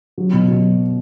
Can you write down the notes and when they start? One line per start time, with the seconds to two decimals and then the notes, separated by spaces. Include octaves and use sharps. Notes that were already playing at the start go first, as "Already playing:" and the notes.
0.18 F#3
0.33 B2
0.48 F#3